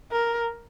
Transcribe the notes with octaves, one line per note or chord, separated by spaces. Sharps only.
A#4